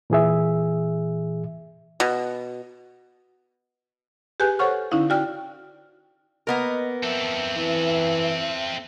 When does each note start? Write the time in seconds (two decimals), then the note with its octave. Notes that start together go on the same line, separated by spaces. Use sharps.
0.10 A#2 E3 G#4 E5
2.00 B2
4.40 G4 G#4 B4 G#5 F#6
4.59 A4 C5 C#5 F#5 C#6 F6
4.91 D3 C#4 D#4 E4 F5
5.10 F#4 D5 G5 F6
6.47 A#3 B3 A#4 D#5
7.03 C4 A4 E5
7.57 E3